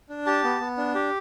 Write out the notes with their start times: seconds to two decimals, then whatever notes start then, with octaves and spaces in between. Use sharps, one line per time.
0.09 D4
0.26 G4 A5
0.44 B3
0.60 B3
0.77 D4
0.95 G4